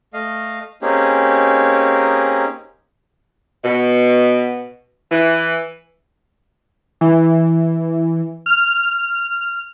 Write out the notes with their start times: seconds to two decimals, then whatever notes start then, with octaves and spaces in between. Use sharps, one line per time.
0.14 A3 D#5 F5
0.82 A#3 C4 C#4 D#4 G4 G#4
3.64 B2
5.11 E3
7.01 E3
8.46 F6